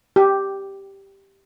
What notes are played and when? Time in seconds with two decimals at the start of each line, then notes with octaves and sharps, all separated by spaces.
0.16 G4